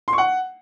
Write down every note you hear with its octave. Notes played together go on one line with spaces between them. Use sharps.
C6
C#6
F#5